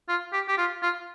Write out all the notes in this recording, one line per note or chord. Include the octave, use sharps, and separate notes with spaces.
F4
G4
G4
F4
F4